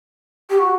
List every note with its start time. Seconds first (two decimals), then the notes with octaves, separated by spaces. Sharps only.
0.50 G4
0.59 F#4